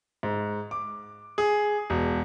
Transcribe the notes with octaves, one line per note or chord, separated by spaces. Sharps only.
G#2
D6
G#4
E1